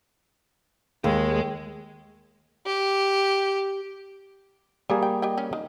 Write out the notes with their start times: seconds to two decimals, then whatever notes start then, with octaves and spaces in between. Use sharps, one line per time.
1.04 D#2 G#3
2.66 G4
4.90 G3 A#3 G4 G#4
5.03 G5
5.22 G4 D#5 G5
5.38 C#4
5.53 D#3